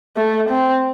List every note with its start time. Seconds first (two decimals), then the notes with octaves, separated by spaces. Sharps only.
0.17 A3
0.50 C4